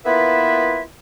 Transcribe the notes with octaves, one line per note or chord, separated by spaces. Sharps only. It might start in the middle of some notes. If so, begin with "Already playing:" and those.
A#3 B3 E4 F4 B4 E5